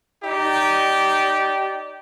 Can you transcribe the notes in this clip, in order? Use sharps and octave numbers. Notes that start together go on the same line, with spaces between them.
D#4 G4 D5